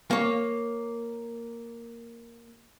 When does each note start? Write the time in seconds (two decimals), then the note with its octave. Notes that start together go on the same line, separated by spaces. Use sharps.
0.11 A#3 C#5